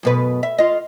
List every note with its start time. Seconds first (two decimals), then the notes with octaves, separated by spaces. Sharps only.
0.03 F#2 B2 B4
0.43 E5
0.58 F4 D#5